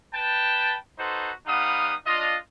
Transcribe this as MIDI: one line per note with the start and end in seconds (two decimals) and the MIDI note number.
0.14 0.76 71
0.14 0.76 79
0.14 0.76 81
0.99 1.32 63
0.99 1.32 66
0.99 1.32 69
0.99 1.32 71
0.99 1.32 72
1.47 1.95 55
1.47 1.95 59
1.47 1.95 63
1.47 1.95 77
1.47 1.95 78
1.47 1.95 87
2.06 2.37 62
2.06 2.37 65
2.06 2.37 75